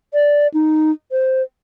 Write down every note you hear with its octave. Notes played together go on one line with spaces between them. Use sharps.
D5
D#4
C5